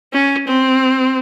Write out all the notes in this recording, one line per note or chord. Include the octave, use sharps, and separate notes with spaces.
C#4
C4